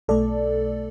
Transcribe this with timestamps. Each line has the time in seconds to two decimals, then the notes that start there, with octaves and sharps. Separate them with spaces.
0.08 B1 B2 A3 A4 D5